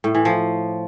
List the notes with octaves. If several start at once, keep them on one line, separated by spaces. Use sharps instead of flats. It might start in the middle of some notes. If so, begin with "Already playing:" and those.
A2
E3
F3